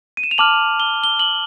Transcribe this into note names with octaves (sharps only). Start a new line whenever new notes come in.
D#7
E7
F7
A5 D6 F6 F#7
G7
G7
F#7